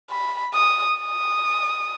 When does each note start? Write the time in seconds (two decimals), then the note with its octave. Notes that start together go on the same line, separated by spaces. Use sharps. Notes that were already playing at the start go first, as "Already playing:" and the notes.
0.11 B5
0.54 D#6
0.97 D#6